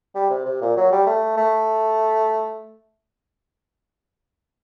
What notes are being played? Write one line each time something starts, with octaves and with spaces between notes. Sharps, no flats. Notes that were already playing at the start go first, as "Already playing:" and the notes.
G3
C3
C3
A#2
F#3
G3
A3
A3